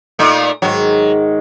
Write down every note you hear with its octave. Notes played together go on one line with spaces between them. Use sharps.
A#2 A3 D#4
G#2 D#3 F#3